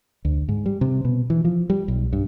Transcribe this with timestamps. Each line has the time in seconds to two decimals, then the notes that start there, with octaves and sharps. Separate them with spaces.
0.25 D2
0.49 G#2
0.66 G3
0.81 C3
1.05 B2
1.30 E3
1.45 F3
1.70 G3
1.88 B1
2.13 G2